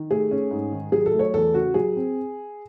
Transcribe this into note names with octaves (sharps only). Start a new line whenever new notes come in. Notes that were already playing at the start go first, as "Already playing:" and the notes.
Already playing: D#3
A3 G#4
C#4
G#2
D#3
F#3 G#4
A4
A3
C#5
E2 A4
C#3 F#4
F#3 G#4
C4